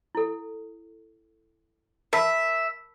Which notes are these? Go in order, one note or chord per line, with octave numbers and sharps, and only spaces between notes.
E4 A4
A#4 E5 A5 B5